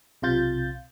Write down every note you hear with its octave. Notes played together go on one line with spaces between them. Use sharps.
B1 C3 F4 G6 A6